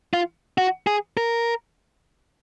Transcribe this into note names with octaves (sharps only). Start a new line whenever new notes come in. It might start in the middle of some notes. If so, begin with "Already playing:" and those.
F4
F#4
G#4
A#4